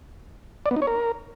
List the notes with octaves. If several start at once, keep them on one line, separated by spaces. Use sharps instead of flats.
D5
B3
D#4
C#5
A#4